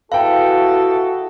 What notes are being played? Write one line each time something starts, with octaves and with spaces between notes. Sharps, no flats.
E4 F#4 G#4 A4 B4 E5 F5 G5